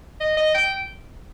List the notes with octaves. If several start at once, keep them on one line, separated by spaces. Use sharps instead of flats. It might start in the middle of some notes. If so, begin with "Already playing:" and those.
D#5
D#5
G5